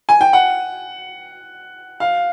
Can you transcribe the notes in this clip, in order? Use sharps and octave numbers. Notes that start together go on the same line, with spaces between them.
G#5
G5
F#5
F5